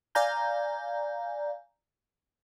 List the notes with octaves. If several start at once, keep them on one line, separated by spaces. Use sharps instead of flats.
D5 F5 G#5 A#5 G6